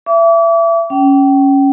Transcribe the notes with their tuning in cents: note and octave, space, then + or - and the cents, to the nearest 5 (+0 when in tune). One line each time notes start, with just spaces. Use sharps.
E5 +25 D6 -35
C#4 +0 G5 -30